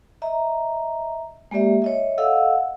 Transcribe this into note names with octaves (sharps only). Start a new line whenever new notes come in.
D#5 E5 A#5
G#3 A#3 G4 D5 E5
C#5 D#5 E5
A4 D#5 F5 F#5 E6